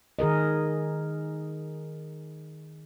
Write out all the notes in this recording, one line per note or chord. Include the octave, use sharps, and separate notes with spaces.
D#3 G#4 A#4 D#5